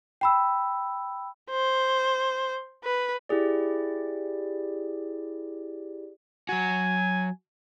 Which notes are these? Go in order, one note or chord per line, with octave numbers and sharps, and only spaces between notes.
G5 B5 E6
C5
B4
E4 G4 G#4 D5
F#3 F#4 G#5